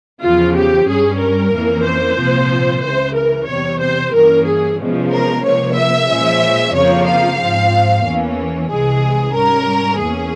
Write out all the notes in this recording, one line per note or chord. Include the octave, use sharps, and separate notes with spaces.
E2 C#3 F3 F4
G4
G2 G3 C#4 G#4
A#4
F2 E3 A#3 C#4
C5
C2 A#2 F3 C4
C#2 C#3 E3 C5
A#4
E2 C3 G3 C#5
C5
G2 E3 A#3 C#4 A#4
G#4
E2 C3 F3 G#3 C#4
A#4
C#2 C3 F3 A#3 C#5
E5
A#2 F3 G#3 C#4
F2 C#3 F3 A#3 C#5
F5
G#2 F3 C4
E2 E3 A#3 C#4
C2 C3 E3 G#3 G#4
G#2 G3 C#4 A#4
E2 E3 A#3 C#4 G#4